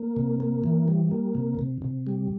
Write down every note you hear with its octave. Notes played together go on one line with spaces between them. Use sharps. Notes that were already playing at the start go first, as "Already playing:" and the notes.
Already playing: A#3
C3
A#3
E3
G3
A#3
C3
C3
C3
G3